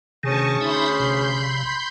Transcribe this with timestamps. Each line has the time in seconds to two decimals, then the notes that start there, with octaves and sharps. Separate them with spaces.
0.23 D2 C3 D#3 C#4 G#4 A5 C#6
0.61 D#4 E5 B5 C6 G6
1.00 A#1 C3